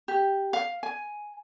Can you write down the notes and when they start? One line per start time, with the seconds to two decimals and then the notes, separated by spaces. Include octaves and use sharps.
0.08 G4
0.53 F5
0.83 G#5